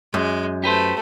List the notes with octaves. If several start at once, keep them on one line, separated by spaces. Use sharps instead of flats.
F#2 G#3
A3 G4 B4 C5